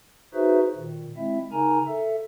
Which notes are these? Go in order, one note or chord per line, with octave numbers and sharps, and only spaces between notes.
D#4 F#4 G#4 B4 C5 E5
A#2 D#3
G#3 C4 E4 E5
C#3 D#4 A#4 G#5 A#5
A4 E5